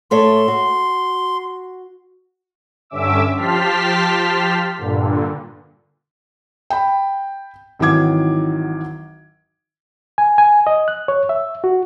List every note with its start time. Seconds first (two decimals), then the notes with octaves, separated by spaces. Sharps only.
0.11 A2 A3 C#5 C6
0.48 F#4
2.90 G2 D3 C#4 E5 D6 E6
3.36 F3 G4 A5 C6 F6 B6
4.77 G2 A#2 D3
6.70 G5 B5
7.79 G#1 D#3 E3 F#3 D6 G#6
10.18 G#5
10.38 G#5
10.67 D#5
10.88 F#6
11.08 C#5
11.29 E5
11.64 F#4